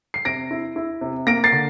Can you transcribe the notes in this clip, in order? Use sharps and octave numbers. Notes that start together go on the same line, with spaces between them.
C7
C3 A#6 D7
E4
E4
C3
A#3 A#6 D7
A6 C7
D3